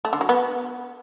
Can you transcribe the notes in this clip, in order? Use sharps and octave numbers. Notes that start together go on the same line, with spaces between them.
A3
D3
F#3
B3